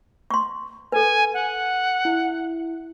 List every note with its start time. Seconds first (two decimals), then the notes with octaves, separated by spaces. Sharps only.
0.31 C6 C#6
0.92 A4 B4 G#5
1.34 F#5
2.05 E4